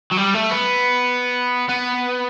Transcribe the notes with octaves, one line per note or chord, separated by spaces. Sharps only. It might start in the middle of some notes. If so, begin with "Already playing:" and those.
F#3
G3
A3
B3
B3